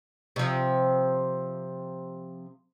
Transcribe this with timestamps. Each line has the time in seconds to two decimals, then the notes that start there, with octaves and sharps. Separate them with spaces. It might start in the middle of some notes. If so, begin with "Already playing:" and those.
0.36 C3 F3